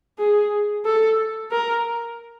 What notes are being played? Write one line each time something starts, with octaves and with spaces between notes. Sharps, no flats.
G#4
A4
A#4